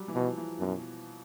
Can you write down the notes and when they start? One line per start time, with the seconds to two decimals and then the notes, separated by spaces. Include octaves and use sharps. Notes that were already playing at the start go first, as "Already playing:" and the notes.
Already playing: F#3 G3
0.08 E3
0.15 B2 F3
0.37 E3
0.60 F#2 B2